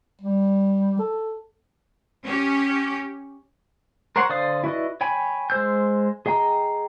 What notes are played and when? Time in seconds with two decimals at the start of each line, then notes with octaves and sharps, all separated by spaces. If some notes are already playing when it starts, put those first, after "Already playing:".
0.22 G3
0.99 A4
2.24 C#4 G4
4.16 A#4 C5 C#5 F#5
4.29 D3 C5 D5 F5 D#6
4.64 E4 F#4 B4 D5 D#5
5.01 C#5 G5 G#5 B5
5.50 G#3 C5 E6 G6
6.26 G#4 D#5 G5 A#5